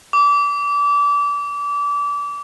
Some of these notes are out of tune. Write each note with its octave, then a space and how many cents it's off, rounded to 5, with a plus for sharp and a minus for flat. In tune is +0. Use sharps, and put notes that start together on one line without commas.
D6 -30